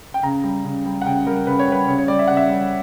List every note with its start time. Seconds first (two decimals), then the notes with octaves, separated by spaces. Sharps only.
0.14 G5
0.23 C#3 A#5
0.44 G3
0.65 C#3
0.86 G3
1.02 F#5
1.06 C#3 G5
1.27 G3 A#4
1.47 C#3 B4
1.59 C#5
1.68 G3 B4
1.88 C#3 C#5
1.98 C#5
2.08 G3 D5
2.19 E5
2.28 C#3 F#5
2.37 E5
2.49 G3